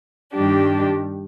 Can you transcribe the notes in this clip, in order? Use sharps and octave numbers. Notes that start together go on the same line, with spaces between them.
G2 D#3 G3 D4 G4